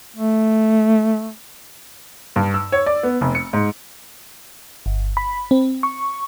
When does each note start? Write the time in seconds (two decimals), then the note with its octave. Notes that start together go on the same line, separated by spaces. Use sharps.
0.16 A3
2.36 G2
2.54 E6
2.72 C#5
2.86 D5
3.03 B3
3.21 F1
3.35 C#7
3.53 G#2
4.86 G1
5.17 B5
5.51 C4
5.83 C#6